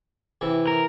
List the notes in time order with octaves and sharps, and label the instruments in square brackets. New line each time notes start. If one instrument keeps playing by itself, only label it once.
[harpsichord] C3 E3 E4
[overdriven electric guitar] A#4